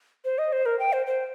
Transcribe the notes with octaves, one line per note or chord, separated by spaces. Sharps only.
C5
D#5
C5
A#4
G5
C5
C5